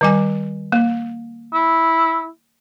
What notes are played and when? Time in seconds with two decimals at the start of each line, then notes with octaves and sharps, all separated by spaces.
0.01 D#3 G3 G#5
0.72 A#3
1.54 E4